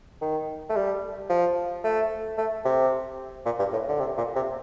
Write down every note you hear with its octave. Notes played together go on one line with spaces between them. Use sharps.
D#3
A3
G3
F3
A3
A3
C3
A#2
G2
A2
D3
C3
A#2
C3